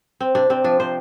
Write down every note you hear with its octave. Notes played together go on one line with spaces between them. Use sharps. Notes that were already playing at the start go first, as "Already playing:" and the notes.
C4
C3 D4
C3 C4
F3 D4
C3 C5